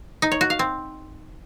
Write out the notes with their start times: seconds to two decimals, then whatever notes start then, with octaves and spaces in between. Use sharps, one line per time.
0.22 D#4
0.32 C#5
0.41 F#4
0.50 F5
0.59 C4